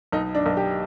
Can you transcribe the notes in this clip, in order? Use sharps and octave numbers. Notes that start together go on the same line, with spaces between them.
B1 D#4
D4
B1
G4